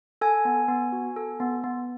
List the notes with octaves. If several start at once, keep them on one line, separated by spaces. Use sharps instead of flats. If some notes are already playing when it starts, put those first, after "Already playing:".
A4 G#5
B3
B3
F#4
A4
B3
B3